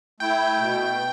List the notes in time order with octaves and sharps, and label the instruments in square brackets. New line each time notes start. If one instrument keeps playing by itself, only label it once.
[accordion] A3 E4 [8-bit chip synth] G5
[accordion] B2